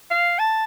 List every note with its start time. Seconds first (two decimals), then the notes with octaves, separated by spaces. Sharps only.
0.11 F5
0.39 A5